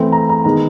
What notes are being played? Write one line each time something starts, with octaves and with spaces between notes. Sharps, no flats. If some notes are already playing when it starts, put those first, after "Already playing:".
Already playing: E3 A3 C4
A#5
A#5
D#3 G#3 B3 A#5